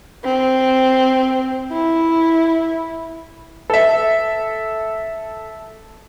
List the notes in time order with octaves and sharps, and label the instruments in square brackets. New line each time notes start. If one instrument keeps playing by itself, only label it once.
[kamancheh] C4
E4
[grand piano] A4 E5